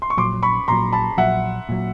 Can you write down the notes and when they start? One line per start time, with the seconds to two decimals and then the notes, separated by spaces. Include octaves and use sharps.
0.02 C6
0.10 C#6
0.17 A#1 A#2 F#3 C6 D6
0.43 B5 C#6
0.68 A#1 A#2 F#3 A#5 C6
0.93 A5 B5
1.18 A#1 A#2 F#3 E5 F#5
1.69 A#2 F#3